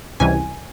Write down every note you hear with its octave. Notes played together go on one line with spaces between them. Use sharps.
C#2 C3 E3 G3 G#5